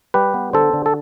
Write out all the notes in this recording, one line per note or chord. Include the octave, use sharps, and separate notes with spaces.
G3 G4 B4
B3
D3 A4 C5
D3
A4